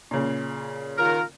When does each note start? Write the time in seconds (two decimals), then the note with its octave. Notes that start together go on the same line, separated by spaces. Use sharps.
0.11 A#2 C#3
0.98 D#3 F4 A#4